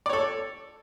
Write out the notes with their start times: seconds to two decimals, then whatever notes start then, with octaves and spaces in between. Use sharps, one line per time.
0.06 D5
0.09 C#5
0.13 A4